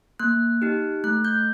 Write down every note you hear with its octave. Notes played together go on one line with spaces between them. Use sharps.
A#3 F#6
D#4 G4
A3 F#6
G6